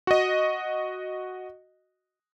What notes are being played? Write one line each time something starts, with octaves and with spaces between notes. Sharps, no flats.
F#4 D#5